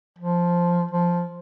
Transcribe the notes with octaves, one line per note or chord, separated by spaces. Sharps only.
F3
F3